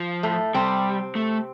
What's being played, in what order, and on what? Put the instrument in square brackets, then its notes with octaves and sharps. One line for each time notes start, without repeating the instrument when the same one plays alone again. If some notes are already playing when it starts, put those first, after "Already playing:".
Already playing: [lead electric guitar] F3
[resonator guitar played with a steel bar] A2 A3
[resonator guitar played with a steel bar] C3 C4 [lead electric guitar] G3
[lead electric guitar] A3